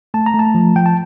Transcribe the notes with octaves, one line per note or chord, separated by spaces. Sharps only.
A3 A5
A#5
A3
A5
F3
F3 G5
A5